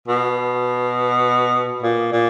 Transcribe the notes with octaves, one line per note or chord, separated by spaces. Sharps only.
B2
A#2
A#2